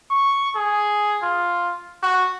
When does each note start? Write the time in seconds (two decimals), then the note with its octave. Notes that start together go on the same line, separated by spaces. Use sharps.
0.11 C#6
0.56 G#4
1.22 F4
2.03 F#4